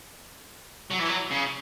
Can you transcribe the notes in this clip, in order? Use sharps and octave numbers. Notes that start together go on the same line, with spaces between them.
F#3
E3
F#3
C#3